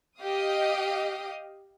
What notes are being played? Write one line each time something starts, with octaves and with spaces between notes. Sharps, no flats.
G4 D#5 F5 D#6